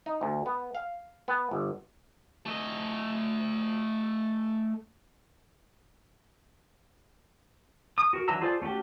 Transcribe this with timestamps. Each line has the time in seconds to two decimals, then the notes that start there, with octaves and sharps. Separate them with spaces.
0.06 D#4
0.21 D2
0.46 B3
0.75 F5
1.28 B3
1.51 G1
2.46 A3 D#5
7.98 D#6
8.13 F#4 A#4
8.28 D3 E3 F#3 A#5 E6
8.41 F4 G#4 A4 C5 D5
8.62 A3 C#4 F#4 G4